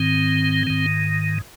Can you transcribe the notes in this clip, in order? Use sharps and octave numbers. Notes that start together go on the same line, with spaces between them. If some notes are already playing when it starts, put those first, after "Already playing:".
Already playing: G#2 D#3 C4
G#2 D#3